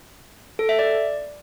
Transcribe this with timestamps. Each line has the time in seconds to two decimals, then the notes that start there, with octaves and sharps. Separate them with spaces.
0.59 A4
0.69 E5
0.79 D5